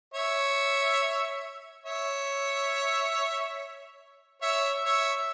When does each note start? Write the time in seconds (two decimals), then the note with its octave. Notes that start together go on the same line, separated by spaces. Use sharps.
0.14 C#5 E5
1.85 C#5 E5
4.42 C#5 E5
4.85 C#5 E5